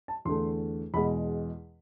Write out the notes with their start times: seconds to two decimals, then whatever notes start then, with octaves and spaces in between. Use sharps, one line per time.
0.08 A5
0.25 E2 D3 A3 C6
0.94 E2 B2 G#3 B5